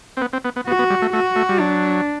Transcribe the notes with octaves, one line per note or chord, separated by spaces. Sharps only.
C4
B3
C4
B3
B3
B3 F#4
B3
G3
A3
A3 F#4
A3
G3
F#3 D4